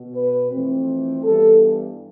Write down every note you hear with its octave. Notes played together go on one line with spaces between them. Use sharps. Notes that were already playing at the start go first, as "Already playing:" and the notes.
Already playing: B2 B3
B4
F2 E3 A3 C4
G2 E3 G3 B3 A4